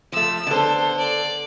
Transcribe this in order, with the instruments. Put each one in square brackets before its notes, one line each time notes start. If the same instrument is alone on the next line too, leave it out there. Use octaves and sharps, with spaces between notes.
[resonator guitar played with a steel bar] F3 A3 [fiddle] E6
[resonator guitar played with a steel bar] D3 A4 [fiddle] B3 C5
[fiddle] D5